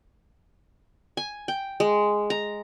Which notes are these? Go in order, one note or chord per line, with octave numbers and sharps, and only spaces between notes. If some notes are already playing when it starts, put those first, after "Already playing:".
G#5
G5
G#3
A#5